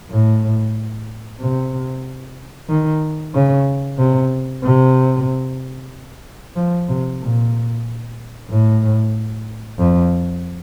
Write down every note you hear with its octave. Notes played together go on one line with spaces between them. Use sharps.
A2
C3
D#3
C#3
C3
C3
F3
C3
A#2
A2
F2